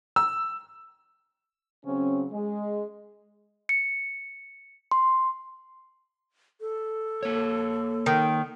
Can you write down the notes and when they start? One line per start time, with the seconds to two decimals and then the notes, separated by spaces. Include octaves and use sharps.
0.16 E6
1.84 C#3 F#3 C4 C#4
2.31 G#3
3.69 C#7
4.91 C6
6.61 A4
7.23 A#3 C#5
8.06 D#3